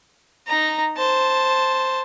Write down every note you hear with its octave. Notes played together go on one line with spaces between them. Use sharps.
D#4 A#5
C5 A5